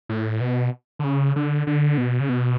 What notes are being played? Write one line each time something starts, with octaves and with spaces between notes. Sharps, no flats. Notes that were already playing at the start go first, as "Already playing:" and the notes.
A2
B2
D3
C#3
D3
D3
B2
C#3
B2